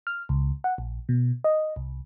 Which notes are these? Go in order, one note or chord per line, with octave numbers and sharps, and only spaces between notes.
F6
C#2
F#5
A#1
B2
D#5
C2